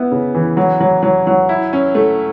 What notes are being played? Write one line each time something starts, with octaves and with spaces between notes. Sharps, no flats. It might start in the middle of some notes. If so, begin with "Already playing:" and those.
Already playing: B3 E4
C#3
E3
F#3
F#3
F#3
F#3
E4
C#4
A3